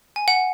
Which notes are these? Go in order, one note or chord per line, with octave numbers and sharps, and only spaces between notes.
G#5
F#5